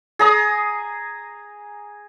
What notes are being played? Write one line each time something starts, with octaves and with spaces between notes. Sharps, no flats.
G#4 A#5 D#6